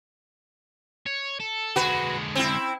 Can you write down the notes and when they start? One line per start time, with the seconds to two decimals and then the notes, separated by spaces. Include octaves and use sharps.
1.06 C#5
1.40 A4
1.76 D3 G#3 F#4 B4
2.35 C4 E4